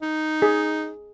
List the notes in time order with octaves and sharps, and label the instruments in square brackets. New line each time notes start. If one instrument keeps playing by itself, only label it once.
[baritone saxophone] D#4
[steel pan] G#4